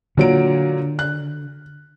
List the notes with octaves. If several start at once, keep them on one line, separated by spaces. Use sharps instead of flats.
A#2 D3 F#3 D7
F#6